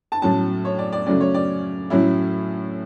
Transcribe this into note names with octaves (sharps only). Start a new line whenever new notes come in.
A5
A2 F#3 C#4 A5
C#5
D5
D5
C#3 F#3 A3 C#4 D5
C#5
D5
A2 F#3 C#4 E4